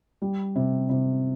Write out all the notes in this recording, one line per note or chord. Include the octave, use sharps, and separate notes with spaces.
G3
C3
C3